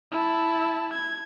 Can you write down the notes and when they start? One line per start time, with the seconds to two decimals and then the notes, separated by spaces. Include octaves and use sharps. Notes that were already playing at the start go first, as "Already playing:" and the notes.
0.12 E4 A5
0.94 G#6